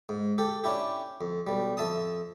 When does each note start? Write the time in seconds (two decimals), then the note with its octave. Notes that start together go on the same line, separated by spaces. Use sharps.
0.09 G#2
0.38 G4 A4
0.64 C#4 D4 E4 G4
1.21 F2
1.47 B1 G3
1.77 F2 E5 A5 D#6